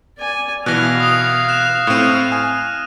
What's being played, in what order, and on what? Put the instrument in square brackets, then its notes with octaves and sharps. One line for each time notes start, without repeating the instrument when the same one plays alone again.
[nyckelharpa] D5 G#5
[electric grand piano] B2 E3 [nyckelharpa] F5 [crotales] F#6 A#6
[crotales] D#6 F7
F#6 E7
[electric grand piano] A2 C4 [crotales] F6 D#7
[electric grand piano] G#5